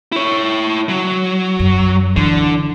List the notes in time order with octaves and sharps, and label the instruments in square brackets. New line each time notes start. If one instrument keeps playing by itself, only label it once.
[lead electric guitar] E4 C#5
F#3
[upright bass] F#2
[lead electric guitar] D3 [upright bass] E3